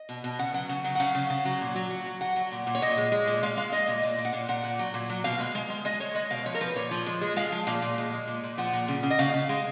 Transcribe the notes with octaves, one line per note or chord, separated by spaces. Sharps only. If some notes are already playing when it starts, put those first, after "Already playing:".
Already playing: D#5
B2
B2
C#3 F#5
F#3 F#5
C#3
F#3
F#5
C#3 F5
C#3
C#3
F#3
A#2
F#3
F#3
F#3
F#3 F#5
F#3
A#2
A#2
C#5
A#2 D#5
G#3
G#3
A#2
G#3 F5
G#3 F5
G#3 D#5
A#2
A#2
A#2
F#5
A#2 F5
A#2 F#5
A#2
F#3
A#2
F#3
B2 F5
G#3
G#3
G#3
G#3 D#5
G#3 C#5
G#3 D#5
B2 F5
F3 C#5
A#4
F3 B4
A#2 C#5
F3
G#3
G#3
G#3 F5
F3
A#2 F5
A#2
G#3
G#3
A#2
A#2
F3 F#5
A#2
C#3
C#3
D#5
C#3 F5
C#3
G#3